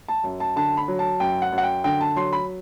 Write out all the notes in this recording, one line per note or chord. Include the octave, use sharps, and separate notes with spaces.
A5
F#2
A5
D3 A5
B5
F#3
A5
F#2 G5
F#5
F#2
F#5
G5
D3 G5
A5
F#3 C6
B5